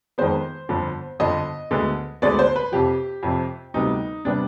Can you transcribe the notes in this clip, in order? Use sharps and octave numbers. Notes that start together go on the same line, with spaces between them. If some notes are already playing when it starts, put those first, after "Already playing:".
F2 D#3 G#3 B3 C5
G1 F2 D3 F3
G1 F2 D3 F3 D#5
D2 D3 G#3 B3
D2 D3 G#3 B3 D5
C5
B4
F2 C3 F3 G4
F2 C3 F3
D2 C3 G3 B3 D#4
C3 G3 B3 D4